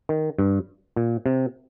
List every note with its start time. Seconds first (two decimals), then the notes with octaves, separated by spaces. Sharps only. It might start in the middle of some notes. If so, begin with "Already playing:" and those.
0.09 D#3
0.38 G2
0.96 A#2
1.26 C3